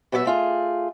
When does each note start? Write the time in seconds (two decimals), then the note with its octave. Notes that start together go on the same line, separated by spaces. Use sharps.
0.12 B2 F#3 B3 C#5 E5
0.26 A3 F4 G#4